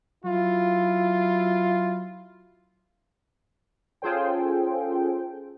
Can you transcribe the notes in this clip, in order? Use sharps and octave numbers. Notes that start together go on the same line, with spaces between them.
F#3 E4 F4
C#4 F4 G#4 A4 C5 G5